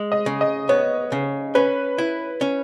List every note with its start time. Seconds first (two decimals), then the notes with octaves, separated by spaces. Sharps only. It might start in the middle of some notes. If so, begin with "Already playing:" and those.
Already playing: G#3
0.12 D#5
0.26 C#3
0.41 D#5
0.69 B3 C#5
1.12 C#3
1.55 C#4 B4
1.98 E4
2.41 C#4